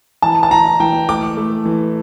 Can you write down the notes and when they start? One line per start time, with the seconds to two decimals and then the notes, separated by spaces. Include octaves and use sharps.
0.22 E3 A5
0.43 A5
0.51 E3 A#5
0.80 E3 G5
1.09 A3 D6
1.37 A3
1.65 E3